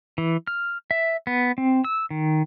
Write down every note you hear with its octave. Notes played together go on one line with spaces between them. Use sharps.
E3
F6
E5
B3
C4
E6
D#3